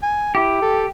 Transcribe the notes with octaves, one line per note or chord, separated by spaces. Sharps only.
G#5
E4 G4
A4